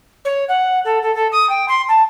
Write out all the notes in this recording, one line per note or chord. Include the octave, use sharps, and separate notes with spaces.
C#5
F#5
A4
A4
A4
D#6
G5
C6
A5